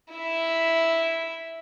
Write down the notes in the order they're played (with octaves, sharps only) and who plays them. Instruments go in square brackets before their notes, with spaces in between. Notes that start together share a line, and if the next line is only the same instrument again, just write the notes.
[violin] E4 E5